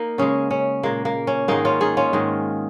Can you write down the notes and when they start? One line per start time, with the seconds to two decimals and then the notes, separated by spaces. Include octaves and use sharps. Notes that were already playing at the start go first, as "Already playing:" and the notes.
Already playing: A#3 D#4
0.18 C#3 G#3 C#4
0.51 C#4
0.83 A#2 G#3 A#3
1.05 A#3
1.27 C#4
1.48 G#2 D#3 G#3 A#3 D#4
1.65 C#4 F4
1.81 D#4 G#4
1.97 C#4 F4
2.13 G#2 D#3 G#3